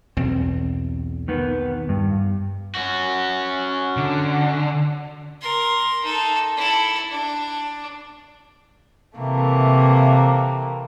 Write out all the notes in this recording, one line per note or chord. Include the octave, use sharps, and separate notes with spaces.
B1 E2 C4
D#3 B3
G2
C#4 F#4
D3
A#4 C6
D#4 A4
E4 A4
D4
C3 E3 A3 A#3